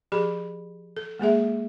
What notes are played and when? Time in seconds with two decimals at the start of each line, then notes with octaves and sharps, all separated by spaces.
0.12 F3 G4 G#4 B5
0.97 A4
1.19 G#3 A#3 G#4 E5